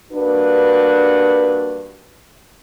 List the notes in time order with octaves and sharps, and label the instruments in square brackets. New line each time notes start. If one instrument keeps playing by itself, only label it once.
[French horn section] G2 A#3 D4 F#4 B4